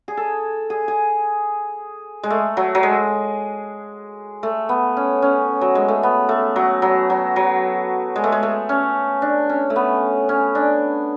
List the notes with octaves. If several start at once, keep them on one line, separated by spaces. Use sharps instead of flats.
G#4
A4
G#4
G#4
G#3
A3
F#3
F#3
G#3
A3
B3
C#4
C#4
F#3
G#3
A3
B3
A3
F#3
F#3
F#3
F#3
G#3
A3
G#3
A3
C#4
D4
C#4
A3
B3
C#4
D4